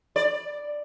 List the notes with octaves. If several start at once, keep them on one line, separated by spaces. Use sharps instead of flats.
D5